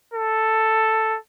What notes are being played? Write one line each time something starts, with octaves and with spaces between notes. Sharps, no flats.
A4